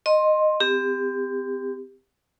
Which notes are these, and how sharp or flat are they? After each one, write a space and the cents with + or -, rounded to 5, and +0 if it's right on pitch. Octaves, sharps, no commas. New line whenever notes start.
D#5 -10 C6 +15
C4 -35 G4 +20